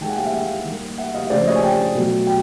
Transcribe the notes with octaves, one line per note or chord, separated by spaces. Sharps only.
D#3 G#3 G5 A5
F#5 G#5
F5 G5
E5 F#5
F5 G5
D#3 G3 A#3
E5 F#5
D#5 F5
C#3 F3 A3 C5 D5
C#5 D#5
G#5
G5 A5
B2 F#3 A3
G5